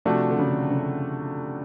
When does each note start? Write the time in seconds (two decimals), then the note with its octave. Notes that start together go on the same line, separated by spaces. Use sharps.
0.05 C3 F3 A3 D4 F#4
0.31 D3
0.38 C#3
0.71 C#3